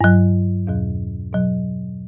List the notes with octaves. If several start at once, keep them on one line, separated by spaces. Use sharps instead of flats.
G2 F#3
E2 B2 F#3
B2 F#3